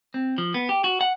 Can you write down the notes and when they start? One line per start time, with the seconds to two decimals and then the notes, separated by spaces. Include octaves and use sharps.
0.14 C4
0.38 F3
0.54 B3
0.69 G4
0.84 F#4
1.01 F#5